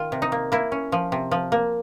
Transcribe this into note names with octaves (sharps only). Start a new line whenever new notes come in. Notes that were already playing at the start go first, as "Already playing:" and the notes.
Already playing: D#3 F4
C3
D#4
A#3
A#3 E4
C#4
F3
C3
F3
A#3